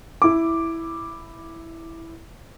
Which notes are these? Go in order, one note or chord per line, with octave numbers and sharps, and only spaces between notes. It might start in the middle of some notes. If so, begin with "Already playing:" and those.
E4 D6